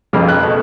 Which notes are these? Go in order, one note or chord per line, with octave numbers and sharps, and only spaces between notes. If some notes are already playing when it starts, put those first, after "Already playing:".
F1 F2 C#3 F3 F6
F#6
B2 A3